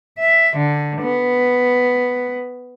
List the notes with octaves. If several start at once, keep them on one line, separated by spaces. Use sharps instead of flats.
E5
D3
B3